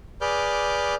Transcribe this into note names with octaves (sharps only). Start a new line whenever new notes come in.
G#4 B4 D5 D6 F6 G6